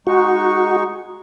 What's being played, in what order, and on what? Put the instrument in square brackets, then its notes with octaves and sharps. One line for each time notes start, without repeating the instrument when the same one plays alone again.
[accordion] G#3 D#4 C#6 [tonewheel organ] F#4